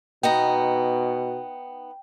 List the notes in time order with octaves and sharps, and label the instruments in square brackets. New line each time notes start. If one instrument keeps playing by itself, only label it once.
[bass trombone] B2 [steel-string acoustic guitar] B3 D#4 A#5 [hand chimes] G5